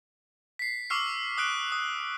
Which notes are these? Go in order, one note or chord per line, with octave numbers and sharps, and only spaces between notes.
B6 C7
C#6 D6 E6 F6 C7
D#6 F#6 D7
D#6